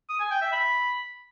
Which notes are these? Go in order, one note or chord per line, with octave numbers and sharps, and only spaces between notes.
D#6
G#5
G5
E5
B5